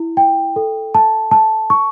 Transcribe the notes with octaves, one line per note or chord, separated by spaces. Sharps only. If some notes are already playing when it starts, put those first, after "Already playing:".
Already playing: E4
G5
A4
A5
A5
C#6